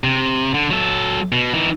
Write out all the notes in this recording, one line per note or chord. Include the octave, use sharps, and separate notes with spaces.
C3
D3
F#3 A4
B2
E3 D#4